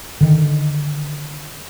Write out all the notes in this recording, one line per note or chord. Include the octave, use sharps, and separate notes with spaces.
D3 D#3